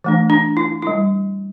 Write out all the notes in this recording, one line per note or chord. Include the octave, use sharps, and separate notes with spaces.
E3 A3 D4
D4
E4
G3 D4 E4